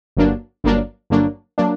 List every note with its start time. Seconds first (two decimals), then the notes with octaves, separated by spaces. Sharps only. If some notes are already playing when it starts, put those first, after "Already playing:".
0.17 G1 G2 F#3 A#3 D4
0.64 G1 G2 F#3 A#3 D4
1.10 G1 G2 F#3 A#3 D4
1.58 F#3 A#3 D4